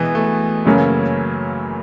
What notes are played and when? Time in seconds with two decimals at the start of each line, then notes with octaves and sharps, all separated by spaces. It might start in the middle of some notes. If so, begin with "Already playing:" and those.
Already playing: B2 E3 G#3 B3
0.15 A3
0.65 F#2 C#3 F#3 A#3 C#4